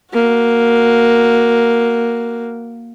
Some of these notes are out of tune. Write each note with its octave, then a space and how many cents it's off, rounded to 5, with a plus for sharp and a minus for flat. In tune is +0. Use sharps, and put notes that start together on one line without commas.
A#3 +0 F#4 +0